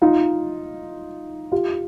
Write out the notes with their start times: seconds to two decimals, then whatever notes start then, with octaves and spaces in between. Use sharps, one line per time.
0.02 D#4 F4
1.52 F4 G4